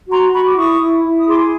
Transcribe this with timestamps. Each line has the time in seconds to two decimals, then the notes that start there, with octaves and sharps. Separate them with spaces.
0.09 F#4 A#5 C6
0.33 F#4 B5 C#6
0.46 D6
0.56 E4 C#6 D#6
0.81 E4
1.05 E4
1.18 D#6
1.27 G#4 C6 D6